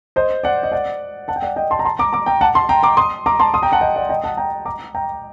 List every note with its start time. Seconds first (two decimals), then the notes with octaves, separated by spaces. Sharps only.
0.16 C5 D#5
0.43 D5 F#5
0.63 D#5
0.72 D5 F#5
1.28 F#5 A5
1.36 G5
1.42 D5 F#5
1.56 D#5 G5
1.71 A5 C6
1.79 A#5
1.85 A5 C6
1.99 A#5 D6
2.13 A#5 D6
2.26 G5 A#5
2.41 F#5 A5
2.55 A5 C6
2.69 G5 A#5
2.83 A#5 D6
2.97 C6 D#6
3.26 A#5 D6
3.39 A5 C6
3.54 C6 D#6
3.62 G5 A#5
3.72 F#5 A5
3.81 D#5 G5
3.96 D5 F#5
4.09 D#5 G5
4.24 F#5 A5
4.37 G5 A#5
4.66 A#5 D6
4.95 G5 A#5